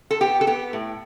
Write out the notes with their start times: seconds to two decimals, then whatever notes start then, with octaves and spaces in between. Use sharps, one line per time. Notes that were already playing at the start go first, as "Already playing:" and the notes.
0.11 A4
0.20 B3 G4
0.41 A4
0.47 B3 G4
0.73 A2